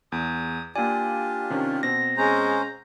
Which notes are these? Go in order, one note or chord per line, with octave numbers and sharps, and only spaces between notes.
E2 D#6
A#3 D4 F4 G4 D5 G#5
C3 D#3 C#4
B2 C4 A#6
G#3 C#4 C5 A#5